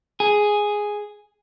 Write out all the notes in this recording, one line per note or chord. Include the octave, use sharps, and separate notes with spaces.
G#4